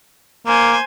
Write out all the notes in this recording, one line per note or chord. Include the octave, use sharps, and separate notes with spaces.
A#3 C5 G#5